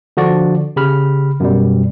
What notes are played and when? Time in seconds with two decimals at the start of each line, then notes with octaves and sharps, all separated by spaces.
0.17 D3 F3 D4 F#4 D5
0.76 C#3 G4 B5 F6
1.40 F#2 B2 G3